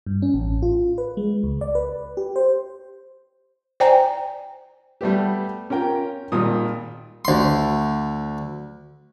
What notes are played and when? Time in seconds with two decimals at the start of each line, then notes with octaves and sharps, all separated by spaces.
0.07 G2
0.22 C#4
0.34 A1
0.62 F4
0.98 B4
1.17 G#3
1.43 C#2
1.61 D5
1.75 B4
2.17 G4
2.36 C5
3.80 C5 D5 G5 G#5 A#5
5.01 G3 A3 B3 G4
5.70 C#4 F4 A#4 G5
6.32 G#1 A#2 G3 D#6
7.25 D2 C6